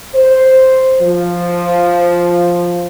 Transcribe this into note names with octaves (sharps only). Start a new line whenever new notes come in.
C5
F3